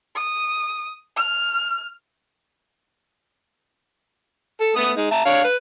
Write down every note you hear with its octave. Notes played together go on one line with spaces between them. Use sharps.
D#6
F6
A4
A3 B3 D#6
G#3 D#4
E5 A5 A#5
D4 C#5 F5
B4